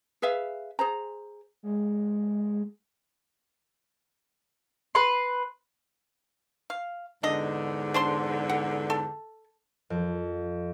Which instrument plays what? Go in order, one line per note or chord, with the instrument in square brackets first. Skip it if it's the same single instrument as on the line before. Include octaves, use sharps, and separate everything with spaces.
[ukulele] G#4 B4 E5 F5
G#4 C5 A#5
[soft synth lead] G#3
[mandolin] B4 C6
[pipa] F5
[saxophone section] E2 G#2 D3 [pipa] D4 D#5
[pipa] D4 C5 C6
F#5
A4
[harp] F2